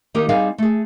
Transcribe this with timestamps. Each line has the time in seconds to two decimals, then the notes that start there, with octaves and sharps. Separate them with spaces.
0.14 D#3 A#3 D#4 G4 A#4
0.29 G3 C4 D#4 G#4 F5
0.58 A3 G#4